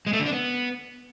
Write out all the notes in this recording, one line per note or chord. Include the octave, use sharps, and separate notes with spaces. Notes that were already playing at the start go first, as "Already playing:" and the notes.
G#3
A3
D3
D4
B3